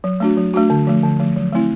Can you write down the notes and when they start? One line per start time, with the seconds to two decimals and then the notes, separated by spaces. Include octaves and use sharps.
0.04 F#3
0.20 A3 D4 F#4
0.37 F#3
0.54 A3 D4 F#4
0.70 D3
0.87 F3 A3
1.03 D3
1.20 F3 A3
1.36 F#3
1.53 A3 C4 E4